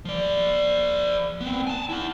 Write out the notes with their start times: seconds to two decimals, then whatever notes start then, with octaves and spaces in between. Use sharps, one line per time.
0.05 F3 D5
1.41 B3 C4
1.67 G#5 A5
1.89 E4 F#5